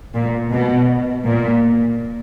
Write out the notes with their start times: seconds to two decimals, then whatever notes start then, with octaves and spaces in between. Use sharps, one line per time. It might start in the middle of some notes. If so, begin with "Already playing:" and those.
0.14 A#2
0.51 B2
1.26 A#2